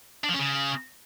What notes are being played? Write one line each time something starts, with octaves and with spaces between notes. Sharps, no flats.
D4
F3
C#4
C#3